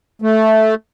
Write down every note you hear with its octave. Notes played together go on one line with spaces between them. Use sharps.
A3